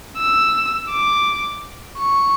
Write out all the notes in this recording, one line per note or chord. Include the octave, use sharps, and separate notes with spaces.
E6
D6
C#6